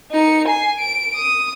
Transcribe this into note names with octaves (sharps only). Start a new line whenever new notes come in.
D#4 C#7
G#5 C7
D7
D#6